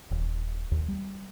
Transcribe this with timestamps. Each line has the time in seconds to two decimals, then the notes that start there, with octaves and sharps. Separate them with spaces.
0.11 D#1
0.71 D#2
0.88 G3